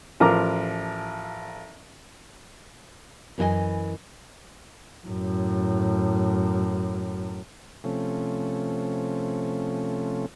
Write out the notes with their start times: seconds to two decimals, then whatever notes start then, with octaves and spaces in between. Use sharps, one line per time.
0.20 A1 F3 F4 A#4 A#5 D6
3.38 F#2 E3 D4 A4 D#5 G#5
5.07 F#2 A2
7.84 C3 F3 A3 C#4